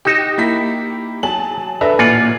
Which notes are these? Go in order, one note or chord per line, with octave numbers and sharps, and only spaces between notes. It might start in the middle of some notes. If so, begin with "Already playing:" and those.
D#4 F#4 G4 E7
A#3 E4 B6
F#3 G#4 A5 F#7
D4 A4 B4 E5 A#5
A1 A#2 F4 F#5 G#5 D6